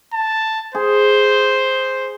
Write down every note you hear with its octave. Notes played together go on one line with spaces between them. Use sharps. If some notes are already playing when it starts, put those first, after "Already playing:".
A5
G#4 C5